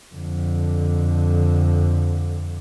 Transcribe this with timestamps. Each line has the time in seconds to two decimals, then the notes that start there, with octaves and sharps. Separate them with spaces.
0.14 F2 D3